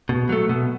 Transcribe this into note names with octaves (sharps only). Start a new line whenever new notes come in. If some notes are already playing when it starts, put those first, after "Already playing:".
B2
F#3 A3
B2